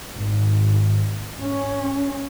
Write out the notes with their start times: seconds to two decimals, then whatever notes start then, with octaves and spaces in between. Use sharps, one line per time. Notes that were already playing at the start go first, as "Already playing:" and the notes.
0.19 G#1
1.44 C#4